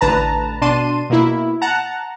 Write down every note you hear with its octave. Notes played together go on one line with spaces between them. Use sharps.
A1 D3 B4 A5 A#5
B2 D4 A5 C6 D#7
B2 A#3 E4
F#5 A5 A#5